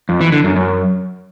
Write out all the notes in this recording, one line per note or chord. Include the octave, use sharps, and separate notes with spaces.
F2
E3
D3
F#2
F#2